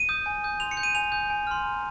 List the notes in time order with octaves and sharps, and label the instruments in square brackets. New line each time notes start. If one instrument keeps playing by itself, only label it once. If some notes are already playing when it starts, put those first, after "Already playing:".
Already playing: [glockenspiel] D#7
D#6 G6
G#5
D#6 G6
C6 F7
C#7
G6
D#7
G#5 F7
D#6 G6
G#5
C6 F6
A#5